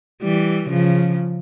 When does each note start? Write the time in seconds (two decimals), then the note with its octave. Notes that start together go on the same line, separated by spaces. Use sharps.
0.23 E3 G3
0.70 C#3 F3